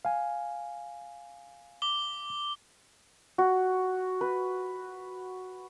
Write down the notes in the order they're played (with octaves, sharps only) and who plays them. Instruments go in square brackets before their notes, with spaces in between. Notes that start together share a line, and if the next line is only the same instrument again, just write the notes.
[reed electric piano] F5 G#5
[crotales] D6 G7
[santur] F#4
B4